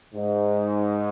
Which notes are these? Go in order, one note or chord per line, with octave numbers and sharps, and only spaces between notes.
G#2